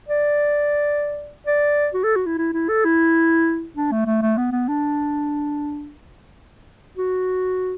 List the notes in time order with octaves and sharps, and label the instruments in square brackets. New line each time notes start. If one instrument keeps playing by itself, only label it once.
[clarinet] D5
D5
F#4
A4
F#4
E4
E4
E4
A4
E4
D4
A3
A3
A3
B3
B3
D4
F#4